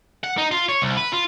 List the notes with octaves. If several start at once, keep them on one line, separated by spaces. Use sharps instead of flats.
F#5
D#4
F4
C#5
C2
B4
F4